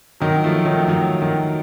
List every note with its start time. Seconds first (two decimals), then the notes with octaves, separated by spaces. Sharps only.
0.20 D#3 F#3
0.44 F3 A3
0.65 D#3 F#3
0.88 D#3 F#3
1.22 D#3 F#3